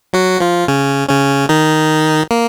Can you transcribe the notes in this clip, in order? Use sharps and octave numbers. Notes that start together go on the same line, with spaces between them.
F#3 F#4
F3 F4
C#3 C#4
C#3 C#4
D#3 D#4
A#3